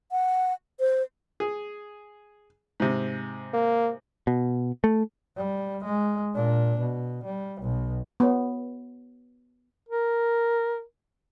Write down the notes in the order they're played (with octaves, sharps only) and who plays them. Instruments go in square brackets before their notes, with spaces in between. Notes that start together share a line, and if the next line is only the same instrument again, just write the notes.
[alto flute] F#5
C5
[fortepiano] G#4
G#2 C3
[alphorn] A#3
[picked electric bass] B2
A3
[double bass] G3
G#3
A#2 D4
B2
G3
B1 B2
[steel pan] B3 C#5
[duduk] A#4